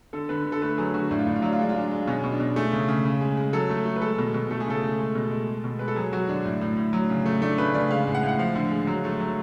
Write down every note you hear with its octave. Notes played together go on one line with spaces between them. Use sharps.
D3 A4
D3 B4
D3
A4
A3 B4
F#3 G#4
D3 F#4
A2 D4
F4
A2 D4
F4
F#3 D4
F4
G#3 D4
F4
G#3 D4
G#3
B2 C#4
B2
D4
B2
A3 G#4
C#3
C#3
C#3
G#3
G#3
F#3 A4
A3
A3
B4
G#3 A4
B2
B2
A3 A4
G#4
C#3 A4
A3
G#3
B2
G#3
G#3
B2
G#3 B4
A4
F#3 G#4
F#3 F#4
D3 D4
A2
A2
A2
F#3
C#3
A3
A3 D4
C#3 B4
C#3 D5
G#3 F5
A2
F#5
A2
F#5
F3 F5
D3
G#3
F#3
A3
F#3